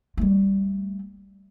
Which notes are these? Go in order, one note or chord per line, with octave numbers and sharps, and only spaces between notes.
G3 A3